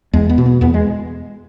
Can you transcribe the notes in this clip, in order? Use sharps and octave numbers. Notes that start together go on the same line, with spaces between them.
E2 G#3
B3
B2
B3
E2 B3
G#3